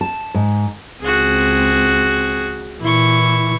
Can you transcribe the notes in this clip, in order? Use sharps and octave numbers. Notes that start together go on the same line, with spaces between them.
A5
G#2
C#2 C4 F#4 G#4
A#2 E3 E4 C#6